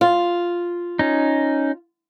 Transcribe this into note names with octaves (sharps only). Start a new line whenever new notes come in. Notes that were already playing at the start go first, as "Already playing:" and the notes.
F4
C#4 D#4